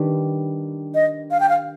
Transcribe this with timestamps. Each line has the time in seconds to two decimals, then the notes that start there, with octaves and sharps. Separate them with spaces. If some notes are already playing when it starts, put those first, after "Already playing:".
Already playing: D#3 G3 D4 G4 B4
0.95 D#5
1.31 F5
1.40 G5
1.49 F5